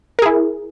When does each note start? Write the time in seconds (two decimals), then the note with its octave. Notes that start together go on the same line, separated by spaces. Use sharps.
0.19 A#4
0.22 G#4
0.26 E4